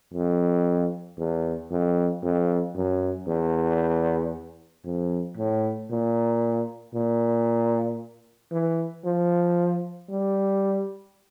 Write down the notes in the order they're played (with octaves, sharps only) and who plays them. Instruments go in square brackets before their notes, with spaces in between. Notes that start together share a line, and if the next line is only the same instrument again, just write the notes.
[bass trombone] F2
E2
F2
F2
F#2
E2
F2
A2
A#2
A#2
E3
F3
G3